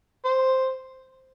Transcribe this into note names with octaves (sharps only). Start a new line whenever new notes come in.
C5